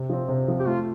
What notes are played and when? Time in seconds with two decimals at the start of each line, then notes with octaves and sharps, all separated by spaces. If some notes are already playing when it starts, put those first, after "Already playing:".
Already playing: C3
0.10 F3 C4
0.29 C3
0.48 F3 C4
0.59 G4
0.67 A3 F4